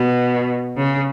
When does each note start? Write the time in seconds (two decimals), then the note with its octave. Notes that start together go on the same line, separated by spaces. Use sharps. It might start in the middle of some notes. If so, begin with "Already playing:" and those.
Already playing: B2
0.77 C#3